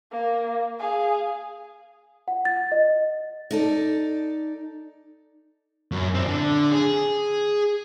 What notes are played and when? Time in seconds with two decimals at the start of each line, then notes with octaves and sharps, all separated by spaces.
0.11 A#3
0.79 G#4 F5
2.28 F#5
2.45 A6
2.72 D#5
3.51 D#4 A4 D5
5.92 F#2
6.15 C4 E4
6.27 D3
6.71 G#4